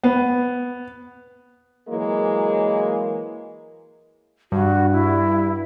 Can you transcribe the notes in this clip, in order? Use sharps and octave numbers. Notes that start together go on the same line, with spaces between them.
B3
E3 F#3 G#3 A#3
G2 F#4
E4